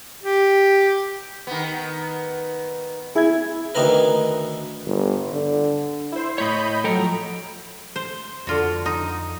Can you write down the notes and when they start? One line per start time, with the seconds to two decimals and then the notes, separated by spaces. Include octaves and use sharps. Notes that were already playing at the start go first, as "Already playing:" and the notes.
0.23 G4
1.47 D#3 B3
3.15 E4 G#4 E5 G#6
3.75 D2 D#3 B3 A#4 B4
4.86 G1
5.32 D3
6.12 E4 C5
6.38 A2 C#5 D#5 B5 G6
6.84 F3 F#3 A4 G5 A#5
7.96 C5
8.47 F2 D3 F4 F#4
8.86 D#4